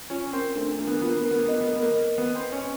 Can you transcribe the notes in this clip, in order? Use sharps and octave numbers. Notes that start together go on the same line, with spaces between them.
C#4 F4
C4 A#4
A3 D4
A#3 D4
B3
A#3
B3 F4
A#3
B3
A#3 A#4
B3
A#3
B3
D#5
A#3
B3
A#3
B3 A#4
A#3
D#5
B3 B4
C4
B4
C#4